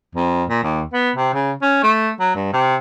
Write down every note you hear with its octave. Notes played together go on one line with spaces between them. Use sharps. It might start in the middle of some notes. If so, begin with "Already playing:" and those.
F2
A#2
D#2
B3
C3
C#3
C#4
A3
F#3
G2
C3